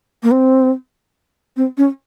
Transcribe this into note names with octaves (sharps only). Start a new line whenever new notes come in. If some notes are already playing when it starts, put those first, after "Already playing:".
A#3
C4
C4
C#4